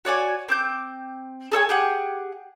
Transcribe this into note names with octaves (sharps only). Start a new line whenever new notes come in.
F#4 C#5 D5 G#5
C4 D6 G6
G#4 A4 C#5 G#5
G4 G#4 F#5